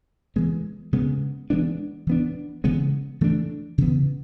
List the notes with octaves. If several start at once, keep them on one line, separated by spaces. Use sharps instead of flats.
E3 G#3 B3
C#3 G#3 B3
E3 G#3 B3 D4
E3 B3 D4
C#3 E3 G#3 B3
E3 A3 D4
C#3 E3 B3